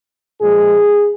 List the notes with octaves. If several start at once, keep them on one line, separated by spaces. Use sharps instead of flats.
A#2 F3 G#3 G#4